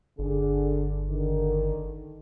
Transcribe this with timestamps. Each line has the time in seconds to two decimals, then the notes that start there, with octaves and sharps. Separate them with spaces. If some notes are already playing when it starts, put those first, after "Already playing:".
0.19 G1 D3 G#4
1.10 D3 D#3